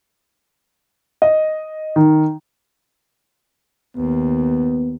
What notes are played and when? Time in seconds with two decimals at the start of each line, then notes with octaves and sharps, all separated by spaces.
1.22 D#5
1.96 D#3
3.96 D#2 B3